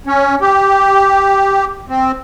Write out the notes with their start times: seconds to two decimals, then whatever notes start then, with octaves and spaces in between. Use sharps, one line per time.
0.07 C#4
0.41 G4
1.89 C4